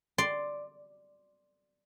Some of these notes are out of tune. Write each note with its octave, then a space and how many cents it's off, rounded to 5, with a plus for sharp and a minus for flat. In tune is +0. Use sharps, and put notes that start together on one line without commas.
D5 +5 C6 +0